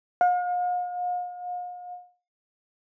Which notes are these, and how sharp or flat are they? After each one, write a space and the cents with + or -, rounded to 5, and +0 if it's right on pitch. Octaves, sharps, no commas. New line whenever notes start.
F5 +45